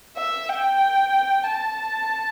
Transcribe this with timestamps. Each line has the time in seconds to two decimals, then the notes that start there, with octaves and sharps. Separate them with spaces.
0.17 E5
0.49 G5
1.44 A5